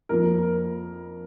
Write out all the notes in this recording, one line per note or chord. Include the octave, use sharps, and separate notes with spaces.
F2 F3 A#3 A#4